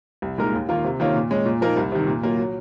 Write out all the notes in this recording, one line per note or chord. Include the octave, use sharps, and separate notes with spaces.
C2
A#2 G#3 D#4 A#4
D#2
D#3 A#3 F4
C3
D#3 A#3 C#4 F4
A#2
G#3 C#4
A#2
F3 A#3 D#4 A#4
C2
C3 D#3
A#2
F#3 A#3 F4
F#3